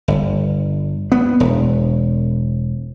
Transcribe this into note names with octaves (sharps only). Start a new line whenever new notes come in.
G1
B3
E1